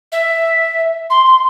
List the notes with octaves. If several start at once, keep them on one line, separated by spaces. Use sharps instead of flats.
E5
C6
C6